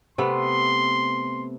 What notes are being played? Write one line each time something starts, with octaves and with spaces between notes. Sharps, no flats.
C3 A3 B3 C6